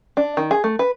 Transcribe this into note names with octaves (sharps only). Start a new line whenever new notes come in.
D4
D#3
G#4
A3
B4